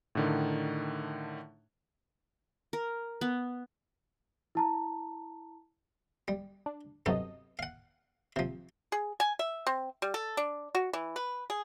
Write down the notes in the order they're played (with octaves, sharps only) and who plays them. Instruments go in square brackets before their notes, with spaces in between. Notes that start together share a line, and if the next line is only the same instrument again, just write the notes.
[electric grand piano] A2 D3 D#3
[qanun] A#4
B3
[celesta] E4 A5 A#5
[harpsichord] G3
[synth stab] D4
[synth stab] G2 F#3 D#5 [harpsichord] C3 B3 A4
[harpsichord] F5 F#5
C3 F3
[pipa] G#4
G#5
E5
C4
G3
A4
D4
F#4
E3
B4
G#4